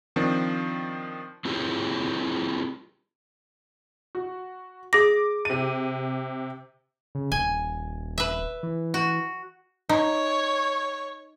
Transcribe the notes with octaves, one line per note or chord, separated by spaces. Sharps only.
D#3 F3 C4 D4
C4 E4 F4 G4 G#4 C#5
F#4
G#4 D6 A#6
C3 D#7
C#3
D#1 G#5
B4 E5
E3
F#4
D#4 C#5